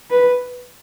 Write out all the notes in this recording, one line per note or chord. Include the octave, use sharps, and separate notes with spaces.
B4